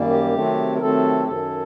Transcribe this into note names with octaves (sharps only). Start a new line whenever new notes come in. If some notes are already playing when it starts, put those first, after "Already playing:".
Already playing: F#2 D#3 G3 A#3
G4
C3 D#3 F#3 A3 C4
A#4
C3 D#3 F#3 A3 C4 A4
G4
F#2 D#3 F#3 A4